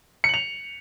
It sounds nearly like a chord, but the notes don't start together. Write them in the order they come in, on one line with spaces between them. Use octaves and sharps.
C#7 F#7 F7